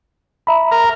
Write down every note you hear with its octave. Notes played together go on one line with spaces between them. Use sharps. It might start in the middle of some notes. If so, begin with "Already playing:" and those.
E5 A#5 B5
A#4